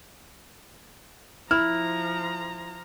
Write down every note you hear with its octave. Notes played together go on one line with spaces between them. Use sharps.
F3 E4 A#5 F6